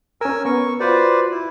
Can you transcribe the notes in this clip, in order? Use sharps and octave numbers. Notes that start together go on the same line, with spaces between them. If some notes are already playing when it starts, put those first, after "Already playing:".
C#4 A#4 G#5 E6
B3 A#4 C#6
F4 F#4 B4 C5 D5
E4